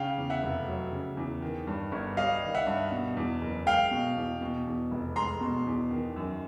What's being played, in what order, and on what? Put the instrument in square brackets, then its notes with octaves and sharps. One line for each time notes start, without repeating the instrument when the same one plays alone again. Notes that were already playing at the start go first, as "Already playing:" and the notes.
Already playing: [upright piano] C#3 [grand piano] F5 G5
[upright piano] E2
[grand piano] E5 F#5
[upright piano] F1
F#3
C#3
E2
D#3
G2
G1
[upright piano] G3 [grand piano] D#5 F5
[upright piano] D#3
[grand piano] E5 F#5
[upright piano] G2
B2
E2
F#1
[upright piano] G#3 [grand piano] F5 G5
[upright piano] B2
E2
B2
E2
F1
[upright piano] G#3 [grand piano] A#5 C6
[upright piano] B2
E2
D#3
F#2